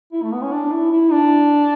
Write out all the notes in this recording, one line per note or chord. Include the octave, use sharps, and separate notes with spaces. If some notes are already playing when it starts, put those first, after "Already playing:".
E4
A3
B3
C#4
D4
E4
E4
D4